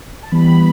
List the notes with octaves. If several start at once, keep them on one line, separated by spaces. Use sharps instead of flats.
A5
E3 G3 B3 B5
B5